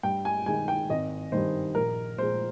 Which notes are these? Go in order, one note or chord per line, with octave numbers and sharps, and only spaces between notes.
G2 G5
G#5
D#3 G#3 G#5
G5
G#1 D#5
G2 D#3 C5
A#1 A#4
A#2 F3 G#3 C5